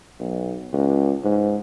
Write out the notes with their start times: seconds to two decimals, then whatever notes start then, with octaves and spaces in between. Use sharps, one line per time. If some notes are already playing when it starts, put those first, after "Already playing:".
0.20 B1
0.73 C#2
1.24 G#2